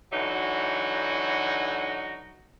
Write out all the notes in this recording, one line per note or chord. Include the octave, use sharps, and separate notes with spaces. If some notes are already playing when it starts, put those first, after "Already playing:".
D3 E3 F#3 D#4 F#4